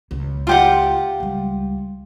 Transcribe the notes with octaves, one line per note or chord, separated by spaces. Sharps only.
C#2
F4 G4 F#5
C#2 G3